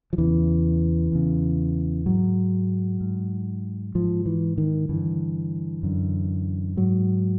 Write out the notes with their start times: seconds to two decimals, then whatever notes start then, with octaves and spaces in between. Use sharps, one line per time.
0.13 F3
0.18 E2 C#3 E3
1.12 E2 C#3
2.06 G#2 F#3
3.01 G#2
3.95 G#2 F3
4.26 E3
4.58 D#3
4.89 G2 D3 E3
5.83 F#2 D3
6.77 G#2 F#3